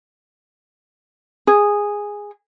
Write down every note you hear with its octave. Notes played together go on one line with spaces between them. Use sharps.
G#4